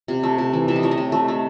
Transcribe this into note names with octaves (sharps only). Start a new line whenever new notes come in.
C3
A3
C3
E3
C3 E5
D#5
A3 C#5
D#5
C3
A3
A3